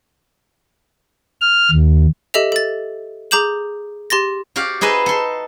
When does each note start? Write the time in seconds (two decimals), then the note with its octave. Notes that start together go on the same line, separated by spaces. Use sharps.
1.41 F6
1.72 D#2
2.34 G4 A4 D#5 E5 F7
2.52 A4 A6
3.31 G#4 A#5 D6 G6 E7 F#7
4.10 G4 C6 A6 A#6
4.56 F#4 G4 D5 F5
4.81 D#4 G#4 B4 D#5 E5
5.06 A4 C6